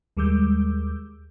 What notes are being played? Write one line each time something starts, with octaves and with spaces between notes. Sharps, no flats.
D#2 G3 G#3 D6 E6 G6